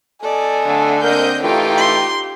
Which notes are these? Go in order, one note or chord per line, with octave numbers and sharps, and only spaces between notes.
A4 D5 D#5 G#5
D3 A3
A#3 C4 D#5 G6
E3 A3 D#4 F4 G4 G5
C6